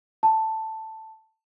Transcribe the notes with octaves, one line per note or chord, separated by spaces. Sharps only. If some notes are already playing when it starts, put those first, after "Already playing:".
A5